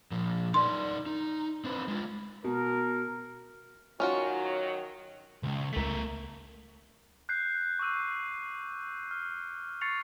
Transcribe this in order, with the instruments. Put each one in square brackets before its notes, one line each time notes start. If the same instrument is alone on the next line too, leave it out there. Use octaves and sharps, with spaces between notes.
[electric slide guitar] A#2 F3
[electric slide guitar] D#4 A#4 D5 [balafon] C6
[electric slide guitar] D#4
C4 D4 B4
G#3 F4
[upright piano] B2 [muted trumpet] A#4
[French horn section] D#3 F#3 [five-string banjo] C#4 F4 F#4
[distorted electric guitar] C#2 C#3
[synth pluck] C#2 B6 [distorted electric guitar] A3 A#4
[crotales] F#6 G6 C7
C#6 D6 E6 D#7
F6
C#6 A6 C7 C#7 F7